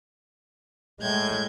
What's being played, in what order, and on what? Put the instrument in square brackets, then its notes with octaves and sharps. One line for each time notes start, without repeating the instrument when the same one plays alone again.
[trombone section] A2 [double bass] G#3 [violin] G6 G#6